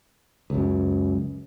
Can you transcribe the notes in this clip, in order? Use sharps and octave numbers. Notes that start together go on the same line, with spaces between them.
C#2 F#2